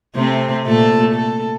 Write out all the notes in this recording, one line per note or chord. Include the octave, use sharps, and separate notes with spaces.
C3 A3 C4
A#2 A3 A4
A4